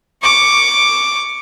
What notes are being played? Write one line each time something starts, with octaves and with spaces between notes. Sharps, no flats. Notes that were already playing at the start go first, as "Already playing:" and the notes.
C#6 D6